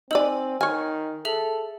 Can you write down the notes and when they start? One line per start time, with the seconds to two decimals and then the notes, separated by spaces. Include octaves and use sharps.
0.11 C4 D#4 D5 G#5 E6 F#7
0.61 D#3 C#5 G#5 F6
1.25 G#4 A4 E5 F#7